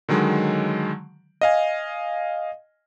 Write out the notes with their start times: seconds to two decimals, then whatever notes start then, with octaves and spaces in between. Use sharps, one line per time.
0.09 D3 D#3 F#3 G#3
1.41 D#5 F5 G#5